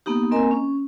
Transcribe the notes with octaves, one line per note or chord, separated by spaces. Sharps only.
A#3 B3 D#4 G4
A#3 C4 A#4 D#5 G#5 A#5
C#4